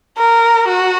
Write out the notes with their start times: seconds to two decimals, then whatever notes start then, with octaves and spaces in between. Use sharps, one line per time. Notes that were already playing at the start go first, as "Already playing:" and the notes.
0.17 A#4
0.68 F#4